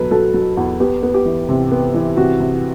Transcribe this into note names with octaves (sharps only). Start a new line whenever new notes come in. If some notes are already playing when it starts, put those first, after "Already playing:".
Already playing: B2 F#3 A4 B4
F#3 A4
F#3
E2
B3 G4
B3
G4
E3
C3
B3
E3
C3 F#4
C3